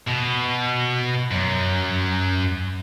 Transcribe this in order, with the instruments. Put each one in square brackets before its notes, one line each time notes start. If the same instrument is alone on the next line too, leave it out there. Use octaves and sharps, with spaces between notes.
[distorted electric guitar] B2
F#2